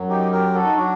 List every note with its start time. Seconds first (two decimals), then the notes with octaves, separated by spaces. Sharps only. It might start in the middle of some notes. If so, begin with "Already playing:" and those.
Already playing: F#2 F#3
0.09 D#4 G4
0.32 G4 A#4
0.54 F#4 A4
0.65 D#4
0.77 F#3 D4 F#4